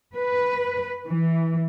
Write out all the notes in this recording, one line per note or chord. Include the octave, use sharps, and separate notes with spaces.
B4
E3